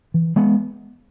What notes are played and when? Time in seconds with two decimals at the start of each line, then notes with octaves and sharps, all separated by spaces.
0.14 E3
0.36 G#3 B3